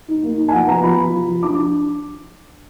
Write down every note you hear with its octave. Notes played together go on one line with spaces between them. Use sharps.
D#4
A#3
D#4
G#5
F3 F#5
B3 A#5
F3 B5
F3
F3
F3
D4 D6
D4